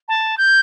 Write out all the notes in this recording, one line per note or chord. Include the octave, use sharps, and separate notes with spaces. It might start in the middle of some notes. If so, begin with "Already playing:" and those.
A5
G6